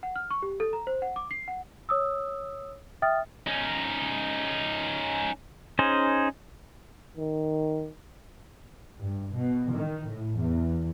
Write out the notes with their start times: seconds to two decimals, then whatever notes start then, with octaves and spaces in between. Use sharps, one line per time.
0.03 F#5
0.16 F6
0.31 C#6
0.42 G4
0.60 A4
0.73 A#5
0.87 C5
1.02 F#5
1.16 D6
1.31 C7
1.48 F#5
1.89 C#5 D#6 E6
3.02 E5 G5 D#6 F6 A6
3.47 C#4 D#4
5.79 C#4 D#4 G#4 C5
7.17 D#3
9.01 G2
9.33 B2
9.73 D#3
10.08 A2
10.38 E2